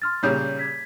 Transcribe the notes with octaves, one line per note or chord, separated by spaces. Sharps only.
C6 F6 A6
A#2 C#3 G3 C#5 G6
G#6 B6